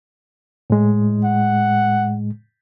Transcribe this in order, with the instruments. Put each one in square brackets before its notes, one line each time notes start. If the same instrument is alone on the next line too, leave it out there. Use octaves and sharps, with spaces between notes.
[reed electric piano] A2 G#3
[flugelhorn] F#5